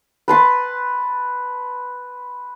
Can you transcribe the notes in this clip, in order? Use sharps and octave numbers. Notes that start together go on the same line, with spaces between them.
B4 A5 C6